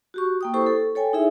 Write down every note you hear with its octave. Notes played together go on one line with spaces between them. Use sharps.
F#4 G4 C#6
A#3 G5 D#6
E4 G4 A4 C5 C#6
A4
A4 C#5 G5 G#5
D#4 E4 G#4 E5